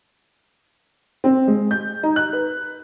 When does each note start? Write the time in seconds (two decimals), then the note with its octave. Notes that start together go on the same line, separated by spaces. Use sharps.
1.24 C4
1.48 G#3
1.71 G6
2.03 D#4
2.16 F#6
2.33 B4